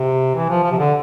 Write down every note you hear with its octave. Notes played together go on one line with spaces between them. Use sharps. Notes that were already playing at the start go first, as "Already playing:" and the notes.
Already playing: C3
E3
F3
F3
C3
D3